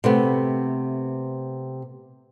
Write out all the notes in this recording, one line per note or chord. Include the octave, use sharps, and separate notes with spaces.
C3 A3 B3